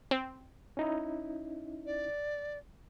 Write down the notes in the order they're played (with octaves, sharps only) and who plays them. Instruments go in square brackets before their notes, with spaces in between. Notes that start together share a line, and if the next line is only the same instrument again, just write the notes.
[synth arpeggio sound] C4
[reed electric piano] C#4 D#4 E4
[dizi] D5